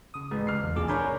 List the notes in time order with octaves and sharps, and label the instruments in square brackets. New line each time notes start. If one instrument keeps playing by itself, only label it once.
[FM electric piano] C#3 D#6
[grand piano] A1 [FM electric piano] G#3
[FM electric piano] C#3 [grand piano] F6 C7
[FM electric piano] E2
[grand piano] A#1 [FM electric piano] C3 G#4 D6
[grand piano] D4 A#4 C#5 [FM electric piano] G#5 B5 G6